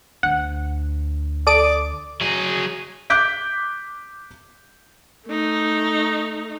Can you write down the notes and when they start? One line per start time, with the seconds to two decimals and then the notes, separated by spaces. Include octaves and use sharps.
0.23 D2 F#5
1.47 A4 D5 D6 D#6 D7
2.21 F#3 G#4
3.10 D6 F#6 G6 B6 D7
5.28 A3 D#4